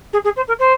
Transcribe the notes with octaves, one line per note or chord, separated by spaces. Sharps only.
G#4
G#4
C5
A#4
C5